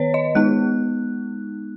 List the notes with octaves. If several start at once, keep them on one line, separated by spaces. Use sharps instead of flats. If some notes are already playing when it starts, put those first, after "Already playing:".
Already playing: D#3 B3 B4 C#5
D#5
G#3 B3 D#4 F#6